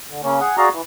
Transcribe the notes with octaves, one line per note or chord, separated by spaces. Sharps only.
D3
C#3 A#3 C#4
G#4 F#5
F#4 G#4 D5 F5 A#5
E3